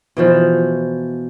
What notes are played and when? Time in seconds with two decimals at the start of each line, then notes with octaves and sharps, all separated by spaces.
0.17 B2 E3 F3